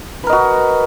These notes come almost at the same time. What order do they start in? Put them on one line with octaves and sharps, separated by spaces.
B4 A#4 D#5 F#4